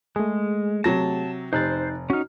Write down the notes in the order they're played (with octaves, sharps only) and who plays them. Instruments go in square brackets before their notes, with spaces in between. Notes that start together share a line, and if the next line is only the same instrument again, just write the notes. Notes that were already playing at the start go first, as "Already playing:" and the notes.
[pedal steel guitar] G#3 [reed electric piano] A3 G#4
[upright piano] C3 F#3 A#6 [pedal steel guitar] A5
[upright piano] F1 [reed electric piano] D#4 F#6 A6 [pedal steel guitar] C5
[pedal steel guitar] C#4 D#4 [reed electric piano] F#4 F6